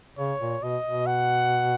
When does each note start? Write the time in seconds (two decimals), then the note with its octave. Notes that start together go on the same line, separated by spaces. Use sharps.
0.18 C#3 C#5
0.41 A#2
0.63 B2 D#5
0.84 B2
1.06 F#5